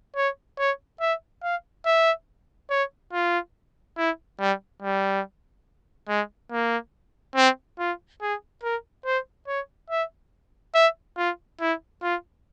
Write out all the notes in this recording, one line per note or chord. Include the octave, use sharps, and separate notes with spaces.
C#5
C#5
E5
F5
E5
C#5
F4
E4
G3
G3
G#3
A#3
C4
F4
G#4
A#4
C5
C#5
E5
E5
F4
E4
F4